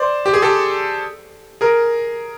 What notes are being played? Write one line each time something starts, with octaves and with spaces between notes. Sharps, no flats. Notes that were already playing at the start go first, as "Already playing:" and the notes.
Already playing: C5 D5
G4
G#4
G4 A4
G#4 A#4